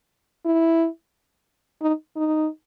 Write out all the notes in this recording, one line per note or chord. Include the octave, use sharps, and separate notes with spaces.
E4
D#4
D#4